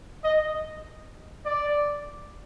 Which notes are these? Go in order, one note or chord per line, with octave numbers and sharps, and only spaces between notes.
D#5
D5